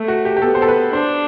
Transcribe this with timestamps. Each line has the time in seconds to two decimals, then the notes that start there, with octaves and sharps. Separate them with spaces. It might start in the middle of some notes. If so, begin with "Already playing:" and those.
Already playing: A3
0.08 F#4
0.25 G4
0.37 G4
0.42 B3 A4
0.55 C5
0.62 A4
0.68 B4
0.93 D4 C5